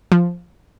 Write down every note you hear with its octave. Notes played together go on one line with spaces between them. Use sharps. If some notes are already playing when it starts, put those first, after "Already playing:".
F3